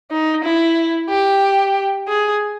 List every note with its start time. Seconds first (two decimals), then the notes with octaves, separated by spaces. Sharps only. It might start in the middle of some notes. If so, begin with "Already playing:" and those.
0.11 D#4
0.45 E4
1.10 G4
2.08 G#4